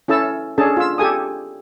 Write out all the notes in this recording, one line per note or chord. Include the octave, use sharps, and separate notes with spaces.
C#4 E4 A4 A5 E6
C#4 D4 G#4 A4 A5
F4 E6
G4 A4 G#5 D#6